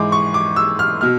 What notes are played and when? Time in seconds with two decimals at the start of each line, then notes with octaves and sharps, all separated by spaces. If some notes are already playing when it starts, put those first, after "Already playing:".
Already playing: G#2 E3 G#3 D6
0.12 C#6
0.34 D6
0.56 E6
0.79 F6
1.01 B2 F6